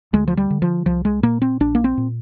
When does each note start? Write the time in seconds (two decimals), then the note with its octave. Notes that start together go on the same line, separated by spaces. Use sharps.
0.13 D2 G#3
0.28 F3
0.37 G3
0.50 D3
0.62 F3
0.86 C2 F3
1.05 G#3
1.23 A#2 A#3
1.42 C4
1.60 A#1 D4
1.75 A#3
1.84 C4
1.97 A#2